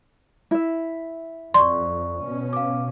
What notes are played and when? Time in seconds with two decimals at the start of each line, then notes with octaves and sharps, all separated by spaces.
0.51 E4 E5
1.54 F2 D5 C6 C#6
2.22 B2 C#4
2.53 F5 D6